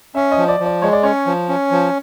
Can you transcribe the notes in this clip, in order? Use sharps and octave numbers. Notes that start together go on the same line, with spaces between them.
C#4 E5
D#5
F3
D5
F3
D5
G#3 C#5
D5
C#4 C#5
F3
C#4
F3